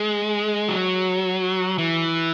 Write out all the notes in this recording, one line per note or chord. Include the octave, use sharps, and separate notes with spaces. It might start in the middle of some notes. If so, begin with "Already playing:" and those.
Already playing: G#3
F#3
E3